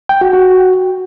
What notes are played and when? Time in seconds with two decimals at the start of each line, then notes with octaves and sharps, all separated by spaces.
0.09 G5
0.21 F#4
0.33 F#4